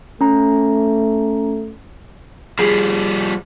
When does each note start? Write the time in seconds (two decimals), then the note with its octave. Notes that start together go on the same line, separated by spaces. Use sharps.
0.21 A3 C#4 A#5
2.59 F3 G3 G#4 B5